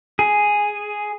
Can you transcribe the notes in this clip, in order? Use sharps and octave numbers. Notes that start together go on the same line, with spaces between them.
G#4